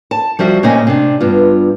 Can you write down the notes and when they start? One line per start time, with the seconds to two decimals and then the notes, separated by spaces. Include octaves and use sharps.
0.11 A5
0.39 F3 G3 F#4 E5
0.63 A#2 C#3 A3 C4 D#5 G#5
0.87 C3 D4
1.20 G2 B3 F4